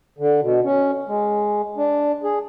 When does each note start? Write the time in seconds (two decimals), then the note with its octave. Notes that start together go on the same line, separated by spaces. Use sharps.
0.19 D3
0.42 B2
0.64 C#4
1.07 G#3
1.77 D4
2.24 G#4